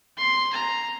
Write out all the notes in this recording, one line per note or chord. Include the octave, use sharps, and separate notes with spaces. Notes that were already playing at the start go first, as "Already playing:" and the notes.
C6
A#5